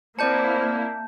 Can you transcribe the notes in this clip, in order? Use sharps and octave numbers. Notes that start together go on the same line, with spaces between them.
A#3 C4 E4 C5 D5 A5 G6 C#7